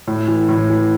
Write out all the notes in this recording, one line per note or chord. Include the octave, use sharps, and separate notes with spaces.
A2
E3
A2
E3